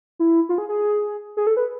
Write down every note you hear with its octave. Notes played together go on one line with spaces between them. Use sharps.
E4
F4
G#4
G#4
G#4
A4
B4